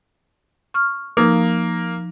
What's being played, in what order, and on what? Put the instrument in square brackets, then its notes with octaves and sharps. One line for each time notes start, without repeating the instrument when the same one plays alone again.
[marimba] C#6 F6
[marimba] F3 D#4 [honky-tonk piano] A#3